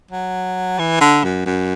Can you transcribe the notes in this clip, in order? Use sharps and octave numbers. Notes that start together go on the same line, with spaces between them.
F#3
E3
D3
F#2
F#2